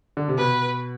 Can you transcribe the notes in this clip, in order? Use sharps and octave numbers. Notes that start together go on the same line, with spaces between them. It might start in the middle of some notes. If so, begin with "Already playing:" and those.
D3
C3
B2 B4